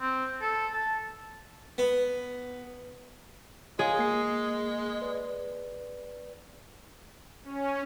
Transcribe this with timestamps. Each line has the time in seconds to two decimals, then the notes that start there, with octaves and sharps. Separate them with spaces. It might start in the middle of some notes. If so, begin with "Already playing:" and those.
0.01 C4
0.41 A4
0.73 A5
1.78 B3
3.79 G#3 G#4 C#5 F5
3.99 A#3 C7
5.02 B4 D5
7.44 C#4